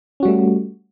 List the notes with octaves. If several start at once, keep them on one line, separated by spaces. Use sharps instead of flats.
G3 A3 C#4 F#4